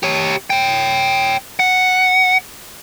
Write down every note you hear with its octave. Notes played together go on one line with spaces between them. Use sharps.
G4 C#5
C#5 G5
F#5